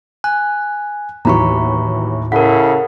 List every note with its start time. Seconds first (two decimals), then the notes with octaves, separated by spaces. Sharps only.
0.24 G#5 F#6
1.25 D#2 A2 E3 F#3 A#5 B5 C#6
2.32 C#3 E4 A4 A#4 F#5 B6